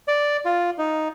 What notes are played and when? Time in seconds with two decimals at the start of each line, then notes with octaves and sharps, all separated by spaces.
0.08 D5
0.45 F4
0.78 D#4